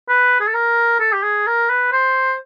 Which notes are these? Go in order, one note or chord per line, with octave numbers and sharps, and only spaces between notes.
B4
G#4
A4
A#4
A4
G4
G#4
A#4
B4
C5